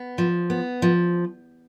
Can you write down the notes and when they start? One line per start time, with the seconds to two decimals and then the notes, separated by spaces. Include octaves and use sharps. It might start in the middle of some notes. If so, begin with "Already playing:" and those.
Already playing: B3
0.18 F3
0.50 B3
0.82 F3